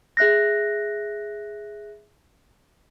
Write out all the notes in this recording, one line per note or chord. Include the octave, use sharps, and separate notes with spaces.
G#4 E5 F#6 A#6